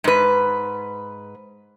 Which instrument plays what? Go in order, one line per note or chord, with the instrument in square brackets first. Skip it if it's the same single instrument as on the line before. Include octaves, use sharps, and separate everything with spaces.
[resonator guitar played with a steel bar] G#2 B4